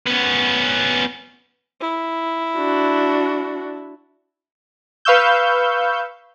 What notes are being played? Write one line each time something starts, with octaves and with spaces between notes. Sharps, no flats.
B3 C#4
E4
D4 F#4
B4 F5 C#6 E6 G6